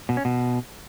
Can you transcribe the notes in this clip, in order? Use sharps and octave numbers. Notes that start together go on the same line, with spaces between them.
B2
C#4
B2